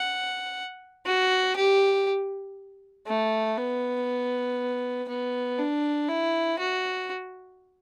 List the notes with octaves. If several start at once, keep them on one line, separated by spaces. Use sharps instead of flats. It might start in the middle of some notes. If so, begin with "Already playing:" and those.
Already playing: F#5
F#4
G4
A3
B3
B3
D4
E4
F#4